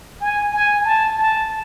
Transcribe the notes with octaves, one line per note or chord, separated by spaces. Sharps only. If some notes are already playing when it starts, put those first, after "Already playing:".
G#5
G#5
A5
A5